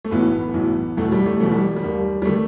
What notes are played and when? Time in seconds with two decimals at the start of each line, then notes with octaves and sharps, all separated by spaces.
0.05 A3
0.11 B1 A2 E3 B3
0.54 B1 A2 E3
0.97 E1 E2 B2 A3
1.12 G3
1.26 A3
1.40 E1 E2 B2 A3
1.52 G3
1.76 G3
1.82 D#2 D#3
2.22 G3
2.25 D#3 A3